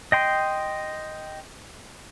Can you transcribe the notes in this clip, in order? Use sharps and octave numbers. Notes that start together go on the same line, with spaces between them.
D#5 G5 C6